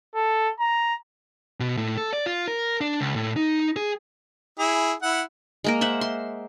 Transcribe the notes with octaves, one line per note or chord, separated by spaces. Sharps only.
A4
A#5
B2
A2
A4
D5
F4
A#4
D4
C#2
A2
D#4
G#4
E4 G#4
E4 F#5
G#3 A#3 A#4
C5 E5 F#5
C6